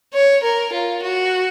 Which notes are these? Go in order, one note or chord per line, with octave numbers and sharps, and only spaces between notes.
C#5
A#4
F4
F#4